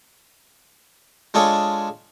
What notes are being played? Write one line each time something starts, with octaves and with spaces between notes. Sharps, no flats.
G#3 D4 F4 G#4 A4 C#5